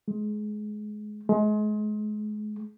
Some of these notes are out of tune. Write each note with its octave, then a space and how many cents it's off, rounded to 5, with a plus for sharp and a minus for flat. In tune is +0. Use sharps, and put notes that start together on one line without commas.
G#3 +25
G#3 +35